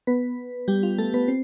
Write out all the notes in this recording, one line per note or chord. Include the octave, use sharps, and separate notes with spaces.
B3 B4
G3 G4
F4
A3 A4
B3 B4
C4